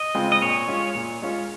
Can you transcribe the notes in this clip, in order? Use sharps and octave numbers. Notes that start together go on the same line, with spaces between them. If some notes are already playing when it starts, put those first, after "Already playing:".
Already playing: D#5
C#3 G#3 C4 F4
D#5
A#2 C#5
G#3 C#4 F4
A#2
G#3 C#4 F4